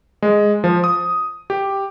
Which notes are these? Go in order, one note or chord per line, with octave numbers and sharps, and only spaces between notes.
G#3
F3
D#6
G4